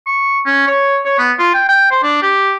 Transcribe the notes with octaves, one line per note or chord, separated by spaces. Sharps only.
C#6
C#4
C#5
C#5
B3
F4
G5
G5
C5
D4
G4